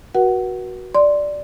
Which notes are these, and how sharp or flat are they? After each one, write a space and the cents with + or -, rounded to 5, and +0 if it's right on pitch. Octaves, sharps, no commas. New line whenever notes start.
F#4 +0 B4 -45 F#5 +15
D5 +0 C6 +0